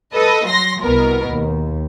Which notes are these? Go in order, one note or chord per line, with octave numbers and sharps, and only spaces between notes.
A4 B4 D#5
F#3 C6 A#6
C2 B2 B3 A#4
D#2